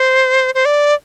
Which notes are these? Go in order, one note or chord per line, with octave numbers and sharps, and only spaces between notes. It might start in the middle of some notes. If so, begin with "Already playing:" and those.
Already playing: C5
C5
D5